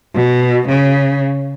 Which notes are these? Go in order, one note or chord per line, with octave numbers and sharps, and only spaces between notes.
B2
C#3